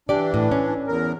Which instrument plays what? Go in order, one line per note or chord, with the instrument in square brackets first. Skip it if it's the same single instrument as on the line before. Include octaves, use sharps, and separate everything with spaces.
[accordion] E3 D4 [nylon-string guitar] G4 D5
[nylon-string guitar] A2
C#4
[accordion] E2 A#4